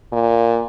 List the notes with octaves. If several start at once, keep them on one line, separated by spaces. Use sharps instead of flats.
A#2